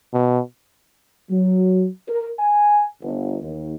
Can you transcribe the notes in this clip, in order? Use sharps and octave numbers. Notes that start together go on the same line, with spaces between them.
B2
F#3
A#4
G#5
G1
D#2